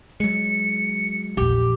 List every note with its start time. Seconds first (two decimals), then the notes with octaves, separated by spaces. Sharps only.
0.20 F#3 G#3 C#7
1.37 A#1 E2 G4